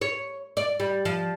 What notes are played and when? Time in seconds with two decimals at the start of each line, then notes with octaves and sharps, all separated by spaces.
0.01 C#5
0.57 D5
0.80 G3
1.05 F3